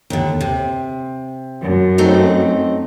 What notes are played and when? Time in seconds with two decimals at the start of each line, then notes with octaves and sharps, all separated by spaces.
0.10 D#2 D3
0.41 C3
1.61 F#2
1.98 A3 C4 D#4